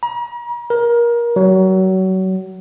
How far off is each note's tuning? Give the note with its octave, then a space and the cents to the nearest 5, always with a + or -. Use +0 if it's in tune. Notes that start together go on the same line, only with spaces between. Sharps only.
A#5 +40
A#4 +25
F#3 +30